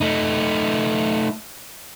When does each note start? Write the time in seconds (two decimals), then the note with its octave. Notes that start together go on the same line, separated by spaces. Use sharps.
0.01 A3 D#4